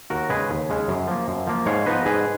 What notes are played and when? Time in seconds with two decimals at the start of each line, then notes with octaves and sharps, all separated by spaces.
0.10 D#2 F#4 A#4
0.29 C#3 G#3 C#4 G#4 B4
0.50 D#2
0.69 C#3 G#3 C#4
0.88 F#2
1.07 F3 A#3
1.28 F#2
1.47 F3 A#3
1.66 G#2 C#5 F5
1.86 F3 B3 D#4 B4 D#5
2.06 G#2 G#4 B4